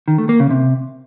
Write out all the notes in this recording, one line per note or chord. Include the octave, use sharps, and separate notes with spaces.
D#3
A3
A#3
C#3
C3